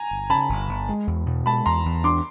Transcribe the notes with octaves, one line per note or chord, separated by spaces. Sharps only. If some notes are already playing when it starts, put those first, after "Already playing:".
Already playing: G#5 A#5
G1
C#3 A5 B5
G1
G1
G#3
E2
B2
G#3 A5 B5
E2 A#5 C6
E2
D4 C6 D6